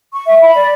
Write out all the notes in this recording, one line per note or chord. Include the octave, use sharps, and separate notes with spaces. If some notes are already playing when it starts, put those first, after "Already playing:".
C#6
E5
B5
D5